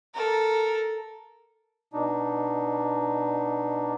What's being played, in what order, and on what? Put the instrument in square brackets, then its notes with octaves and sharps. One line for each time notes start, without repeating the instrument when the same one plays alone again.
[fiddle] A4 A#4
[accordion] B2 D4 D#4